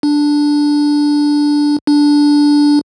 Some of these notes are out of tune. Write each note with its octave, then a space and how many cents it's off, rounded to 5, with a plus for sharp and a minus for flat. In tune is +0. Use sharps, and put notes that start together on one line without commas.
D4 +0
D4 -5